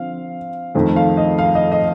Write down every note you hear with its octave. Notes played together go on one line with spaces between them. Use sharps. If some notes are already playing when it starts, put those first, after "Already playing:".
Already playing: D3 F3 C4 F5
F2 D#3 A3 C4
F5
D#5
F5
D#5
D#5